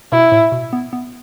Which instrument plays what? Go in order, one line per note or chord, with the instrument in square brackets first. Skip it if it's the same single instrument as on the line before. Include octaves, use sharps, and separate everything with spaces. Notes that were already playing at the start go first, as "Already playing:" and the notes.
[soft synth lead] B2 [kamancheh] E4
[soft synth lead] A2
B2
B3
B3